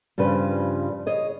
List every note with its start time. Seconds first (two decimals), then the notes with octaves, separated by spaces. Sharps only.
0.18 G2 C#3 F3 G3 B4
1.07 G#4 C#5 D#5